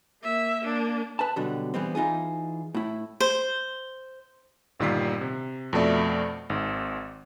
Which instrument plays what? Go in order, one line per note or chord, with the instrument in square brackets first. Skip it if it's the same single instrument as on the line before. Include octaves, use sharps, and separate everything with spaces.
[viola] A#3 E5
A#3 D4
[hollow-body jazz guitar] B4 A5
B2 D3 F#3 G3
E3 G3 B3 C4
E3 D#4 F4 G#4
A2 E4
[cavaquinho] C5
[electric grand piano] G1 A#2 D#3 G3 B6 C7
C3
F2 B2 A3 D5 E5
G#1 G#2